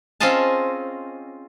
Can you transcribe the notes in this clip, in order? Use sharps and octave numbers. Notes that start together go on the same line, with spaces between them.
C4 C#4 F4 G#4 D#5 A5